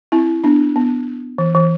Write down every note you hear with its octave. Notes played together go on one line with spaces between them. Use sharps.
C4 E4
B3 D4
B3
E3
E3